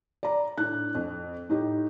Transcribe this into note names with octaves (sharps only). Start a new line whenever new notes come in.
D5 A#5
A2 D4 F#6
F2
A2 D#4 G4